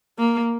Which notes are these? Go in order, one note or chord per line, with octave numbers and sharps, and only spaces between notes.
A#3